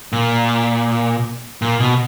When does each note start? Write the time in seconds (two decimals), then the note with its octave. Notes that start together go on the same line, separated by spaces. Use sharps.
0.13 A#2
1.62 A#2
1.80 B2